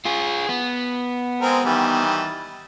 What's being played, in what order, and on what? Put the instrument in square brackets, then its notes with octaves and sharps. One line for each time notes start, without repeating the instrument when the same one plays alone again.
[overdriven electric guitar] F4 G#4
B3
[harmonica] G#3 C4 A#4
D#3 E3 G3